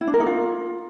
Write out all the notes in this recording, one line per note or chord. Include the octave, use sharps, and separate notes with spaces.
E4
D4
A#4
D#4
F4